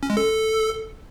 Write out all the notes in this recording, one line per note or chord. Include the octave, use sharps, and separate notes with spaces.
C#4
G#3
A4